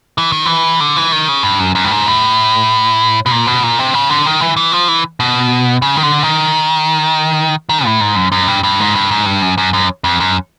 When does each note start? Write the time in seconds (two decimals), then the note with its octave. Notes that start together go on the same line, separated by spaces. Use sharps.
0.18 E3
0.32 D#3
0.45 E3
0.80 D3
0.97 E3
1.12 D#3
1.28 C#3
1.43 G2
1.59 F#2
1.75 F#2
1.84 G2
1.90 G#2
2.06 A2
3.26 B2
3.31 A#2
3.47 B2
3.63 A#2
3.79 C3
3.94 C#3
4.10 D3
4.26 D#3
4.41 E3
4.57 E3
4.72 F3
4.88 E3
5.20 B2
5.82 C#3
5.96 D#3
6.03 D3
6.23 D#3
7.69 D#3
7.85 A2
8.01 G#2
8.16 F#2
8.32 F#2
8.48 G2
8.63 G2
8.80 G#2
8.95 G2
9.11 G#2
9.26 G2
9.42 F#2
9.58 F#2
9.73 F#2
10.04 F2
10.20 F#2